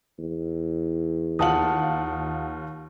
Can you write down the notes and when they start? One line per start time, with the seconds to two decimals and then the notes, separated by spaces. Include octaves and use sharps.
0.19 E2
1.39 D#2 F4 F#5 A5 D#6 F#7